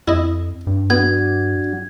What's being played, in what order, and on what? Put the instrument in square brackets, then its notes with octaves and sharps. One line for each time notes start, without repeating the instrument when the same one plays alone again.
[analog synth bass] F2 [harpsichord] E4 D#5
[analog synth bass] G2
[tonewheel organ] F#3 D4 F#4 [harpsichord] B3 [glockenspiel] G#6